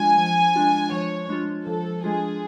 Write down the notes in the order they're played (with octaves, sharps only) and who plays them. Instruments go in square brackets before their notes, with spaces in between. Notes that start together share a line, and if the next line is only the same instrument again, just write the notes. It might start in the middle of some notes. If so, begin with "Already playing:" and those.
Already playing: [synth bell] F3 G#3 D4 F4 [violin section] G#5
[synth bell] F3
G#3 D4 F4
[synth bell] F3 [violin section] C#5
[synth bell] G#3 D4 F4
[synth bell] F3 [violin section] A4
[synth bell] G#3 D4 F4 [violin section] G#4